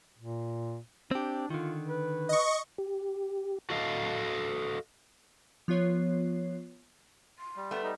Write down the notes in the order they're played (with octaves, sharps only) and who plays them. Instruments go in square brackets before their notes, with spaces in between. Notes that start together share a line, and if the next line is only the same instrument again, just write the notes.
[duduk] A#2
[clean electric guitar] C4 G4 [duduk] D4
[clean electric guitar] D3 D#3 [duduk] F4
[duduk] B4
[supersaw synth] D#5 C#6
[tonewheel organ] G4
[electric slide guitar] F#4 A4 D#5 F5
[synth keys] F3 B3 F4 C#5 F#6 C7
[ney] C6
[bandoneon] G3
[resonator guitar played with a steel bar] A3 B3
[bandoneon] G3 D#4